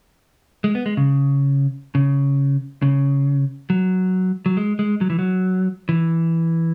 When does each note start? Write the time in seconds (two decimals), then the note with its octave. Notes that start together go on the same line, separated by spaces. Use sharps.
0.64 G#3
0.75 B3
0.86 G#3
0.97 C#3
1.95 C#3
2.82 C#3
3.70 F#3
4.46 F#3
4.57 G#3
4.79 G#3
5.01 F#3
5.10 E3
5.19 F#3
5.89 E3